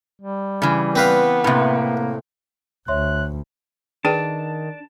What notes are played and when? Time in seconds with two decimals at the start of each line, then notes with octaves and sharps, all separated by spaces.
0.22 G3
0.62 C#3 E3
0.96 B3 C4 B4 F5
1.44 A2 C3 A#3
2.88 D2 C#5 E5 C6 F#6
4.05 D#3 D4 G#4 B4 G5 A5